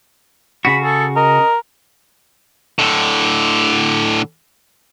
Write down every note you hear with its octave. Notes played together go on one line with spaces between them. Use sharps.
C#3 F#4 B5
G#4 A4
A#4 D#5
A2 D3